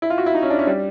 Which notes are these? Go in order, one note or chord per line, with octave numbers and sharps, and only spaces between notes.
E4
F4
F#4
E4
D#4
C#4
D4
C#4
G3